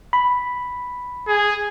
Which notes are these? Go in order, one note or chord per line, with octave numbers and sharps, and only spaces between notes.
B5
G#4